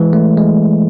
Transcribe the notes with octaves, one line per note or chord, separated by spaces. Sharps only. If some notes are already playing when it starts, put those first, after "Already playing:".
Already playing: E3 G#3
A3
G#3